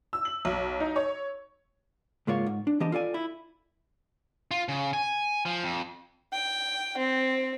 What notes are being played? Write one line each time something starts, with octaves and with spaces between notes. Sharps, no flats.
E6
F#7
B1
D#4
C#5
C#2 G#2 G#3 A#3 F4 C#5
G#2
D4
E3 B3 D4 G4 D#5 A5
F4 A4 D5 G#5
E4
F4
C#3
G#5
F3
F2
G5
C4